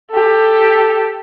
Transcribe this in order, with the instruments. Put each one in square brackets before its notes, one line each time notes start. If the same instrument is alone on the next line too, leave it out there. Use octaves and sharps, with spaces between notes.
[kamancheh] G4 A4